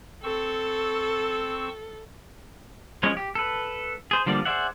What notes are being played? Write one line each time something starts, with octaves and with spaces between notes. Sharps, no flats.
C4 A4 C#6 E6
F3 G#3 C#4 C#5
G4
A4 B4
G#4 C5
D3 F3 G3 A#3 D5
G#4 C5 D5 E5 F#5